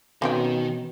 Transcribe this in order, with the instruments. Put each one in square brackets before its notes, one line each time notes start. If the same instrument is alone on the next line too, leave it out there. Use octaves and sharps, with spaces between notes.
[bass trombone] B2 [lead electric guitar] D#3 [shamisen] C4 C#4 G5